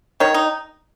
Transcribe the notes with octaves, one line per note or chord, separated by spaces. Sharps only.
D#3 C#5
D#4